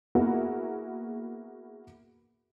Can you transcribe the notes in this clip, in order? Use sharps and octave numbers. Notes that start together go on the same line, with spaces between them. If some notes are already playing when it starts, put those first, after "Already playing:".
A#3 B3 E4 F#4 G#4 A#4